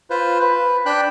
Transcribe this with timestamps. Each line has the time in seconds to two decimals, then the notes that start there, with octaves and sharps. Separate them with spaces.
0.10 F4 B4 C5
0.39 B4
0.86 D4 G5 B5 F#6